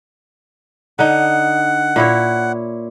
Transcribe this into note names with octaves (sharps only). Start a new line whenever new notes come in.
D3 D#4 F#5
A#2 E4 C#5